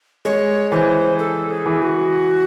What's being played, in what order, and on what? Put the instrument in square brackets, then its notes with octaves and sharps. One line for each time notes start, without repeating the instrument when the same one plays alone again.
[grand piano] G#3 [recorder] C#5
[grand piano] E3 [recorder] C5
[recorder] A4
G#4
[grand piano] E3
[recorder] F#4